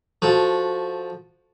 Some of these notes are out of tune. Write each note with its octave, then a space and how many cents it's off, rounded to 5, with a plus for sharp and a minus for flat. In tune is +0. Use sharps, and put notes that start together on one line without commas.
F3 +0 F#4 -15 A4 +0